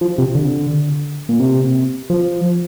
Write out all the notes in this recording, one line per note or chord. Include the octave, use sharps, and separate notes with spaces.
F3
C3
D3
A#2
C3
F3